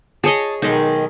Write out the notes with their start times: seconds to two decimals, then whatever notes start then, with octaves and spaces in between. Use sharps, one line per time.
0.24 G#4 C#5 D#5 A5 D#6
0.62 B1 D#3 G#3 D#4